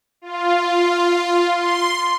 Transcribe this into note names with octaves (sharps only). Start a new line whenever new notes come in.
F4
C6